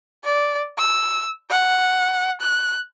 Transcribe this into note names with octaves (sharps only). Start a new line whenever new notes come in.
D5
E6
F#5
F#6